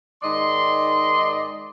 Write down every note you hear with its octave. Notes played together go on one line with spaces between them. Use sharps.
G#2 D#3 D5 D#5 C6